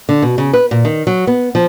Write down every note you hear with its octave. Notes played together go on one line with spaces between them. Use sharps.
D3
B2
C#3
B4
A#2
D#3
F#3
B3
F3